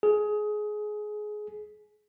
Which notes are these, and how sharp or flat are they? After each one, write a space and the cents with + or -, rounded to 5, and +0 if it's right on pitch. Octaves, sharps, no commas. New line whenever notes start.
G#4 +20